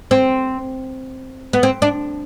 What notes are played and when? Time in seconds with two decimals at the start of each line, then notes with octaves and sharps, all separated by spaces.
0.11 C4
1.53 B3
1.63 C4
1.82 D4